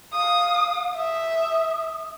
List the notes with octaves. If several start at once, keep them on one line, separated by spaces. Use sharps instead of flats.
F5 D#6
E5 D#6